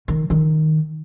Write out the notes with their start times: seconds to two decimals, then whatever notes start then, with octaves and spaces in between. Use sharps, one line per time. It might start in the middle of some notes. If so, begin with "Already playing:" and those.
0.08 D#3
0.30 D#3